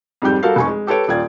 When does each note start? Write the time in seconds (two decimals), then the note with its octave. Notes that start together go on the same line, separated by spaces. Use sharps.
0.22 F2 G#2 G3 G4 G6
0.43 G3 F#4 A4 A#4 F5
0.56 F1 G#5 C#6
0.68 G#3
0.87 G4 A4 B4 C#5 D7
1.08 D#1 F4 D5 G5 G#6